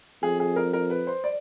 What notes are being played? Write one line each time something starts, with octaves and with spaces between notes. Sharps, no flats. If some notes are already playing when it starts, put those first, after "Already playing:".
F2 G#4
G#4
A#4
A#4
B4
C5
D5